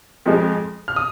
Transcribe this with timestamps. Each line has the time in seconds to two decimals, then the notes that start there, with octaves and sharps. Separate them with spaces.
0.26 F2 F3 G#3
0.88 F6
0.96 D#6